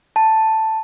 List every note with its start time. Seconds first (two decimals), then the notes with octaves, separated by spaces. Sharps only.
0.16 A5